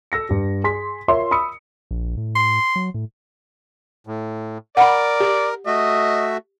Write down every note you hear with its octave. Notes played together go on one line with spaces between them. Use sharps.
A4 E6 A#6 C#7
G2 G4
G#4 C6 B6
F4 A#4 C#5 E5 C6
B5 D#6 E6 C#7
A#1
A2
C6
F#3
A2
A2
A#4 D5 F#5 B5
G4
A3 F#4 D#5 E5